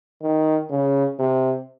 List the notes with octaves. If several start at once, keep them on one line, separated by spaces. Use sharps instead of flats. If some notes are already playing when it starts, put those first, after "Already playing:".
D#3
C#3
C3